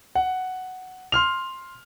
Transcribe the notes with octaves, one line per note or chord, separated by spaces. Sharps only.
F#5
C6 F6 F7